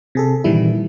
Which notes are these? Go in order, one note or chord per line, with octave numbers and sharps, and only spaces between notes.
C3 G#4 A4
A#2 D#3 E3 G3 E4